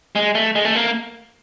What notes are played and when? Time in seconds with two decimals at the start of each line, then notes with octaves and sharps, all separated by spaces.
0.16 G#3
0.35 A3
0.55 G#3
0.65 A3
0.76 A#3